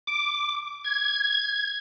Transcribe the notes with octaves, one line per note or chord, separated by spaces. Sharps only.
D6
G#6